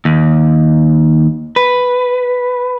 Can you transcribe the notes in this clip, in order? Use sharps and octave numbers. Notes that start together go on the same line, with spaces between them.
D#2
B4